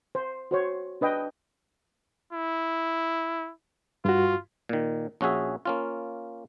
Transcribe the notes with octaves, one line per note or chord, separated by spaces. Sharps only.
C5
F#4 C5 C#5
D4 B4 D#5 G5
E4
G2 F4 F#4
A#2 D#3
A#1 C#4 F#4 G#4 E5
A#3 C#4 F4